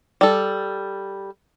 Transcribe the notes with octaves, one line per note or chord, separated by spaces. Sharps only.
G3 A4